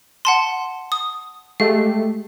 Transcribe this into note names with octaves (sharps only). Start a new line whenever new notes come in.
F#5 A5 C6
D#6
G#3 A3 G4 F5